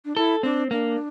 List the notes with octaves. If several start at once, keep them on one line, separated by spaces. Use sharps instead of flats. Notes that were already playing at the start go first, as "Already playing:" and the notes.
D4
E4 A4
C4 D4
A#3 D4